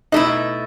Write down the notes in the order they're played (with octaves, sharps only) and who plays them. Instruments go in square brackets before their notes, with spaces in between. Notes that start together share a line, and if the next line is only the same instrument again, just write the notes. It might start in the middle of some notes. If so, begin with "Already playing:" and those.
[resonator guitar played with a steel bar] B2 A3 E4 [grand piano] D#4